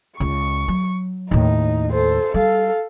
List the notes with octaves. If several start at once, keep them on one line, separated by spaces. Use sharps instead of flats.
C#2 C#6
F#3
D#2 A2 D#4
A4 C5
G3 A4 F5